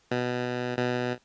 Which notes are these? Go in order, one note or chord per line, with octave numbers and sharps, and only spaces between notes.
B2
B2